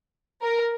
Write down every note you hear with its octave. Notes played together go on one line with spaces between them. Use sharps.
A#4